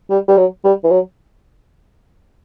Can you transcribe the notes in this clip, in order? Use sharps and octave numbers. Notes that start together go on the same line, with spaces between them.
G3
G3
F#3
G3
E3
F#3